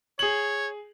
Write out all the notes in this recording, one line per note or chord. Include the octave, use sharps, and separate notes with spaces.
G#4 C#5 F#7